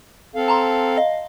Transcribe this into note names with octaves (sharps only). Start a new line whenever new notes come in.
C4 A4 F5
A5 A#5 C6
D#5 F5